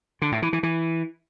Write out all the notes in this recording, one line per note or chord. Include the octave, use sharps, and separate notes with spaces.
D3
A2
E3
E3
E3